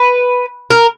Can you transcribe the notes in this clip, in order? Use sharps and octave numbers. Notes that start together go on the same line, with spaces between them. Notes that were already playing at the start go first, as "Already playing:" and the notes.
Already playing: B4
A#4